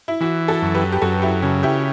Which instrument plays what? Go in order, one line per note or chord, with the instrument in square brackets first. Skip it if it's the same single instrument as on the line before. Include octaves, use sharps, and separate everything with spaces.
[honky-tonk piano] E4
[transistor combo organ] E3 [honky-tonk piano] F#4
[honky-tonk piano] F#4 A4
[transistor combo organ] F#2
[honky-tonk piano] G4 B4
G4
[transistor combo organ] F#2 [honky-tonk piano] F#4 A4
[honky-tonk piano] E4 G4
[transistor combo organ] C#3 [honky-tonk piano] F#4
[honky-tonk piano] E4 G4